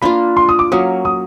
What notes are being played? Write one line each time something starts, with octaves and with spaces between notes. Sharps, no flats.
A#3 D4 F4 B5
C6
D#6
D6
F#3 A#3 C#4 D#6
D#6